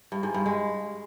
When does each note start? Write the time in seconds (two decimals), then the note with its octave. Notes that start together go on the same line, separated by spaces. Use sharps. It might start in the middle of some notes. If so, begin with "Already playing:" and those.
0.12 G2
0.23 G#2
0.34 G2
0.46 G#3